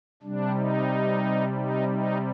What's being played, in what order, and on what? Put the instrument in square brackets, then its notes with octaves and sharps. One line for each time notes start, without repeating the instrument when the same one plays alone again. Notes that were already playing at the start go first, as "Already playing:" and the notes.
[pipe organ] C3 G3 D4
D#4
D#4
D#4